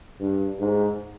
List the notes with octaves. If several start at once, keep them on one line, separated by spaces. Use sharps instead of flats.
G2
G#2